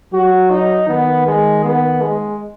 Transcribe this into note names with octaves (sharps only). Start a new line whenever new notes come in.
F#3 F#4
D#4
D#3 B3
G#3
B3
G#3